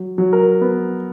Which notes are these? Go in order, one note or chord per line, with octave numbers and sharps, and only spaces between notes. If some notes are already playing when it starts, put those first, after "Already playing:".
Already playing: F#3
F#3
A#4
B3